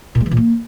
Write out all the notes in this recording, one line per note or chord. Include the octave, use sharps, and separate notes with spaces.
A#2
G#3
E3
A#2
A#3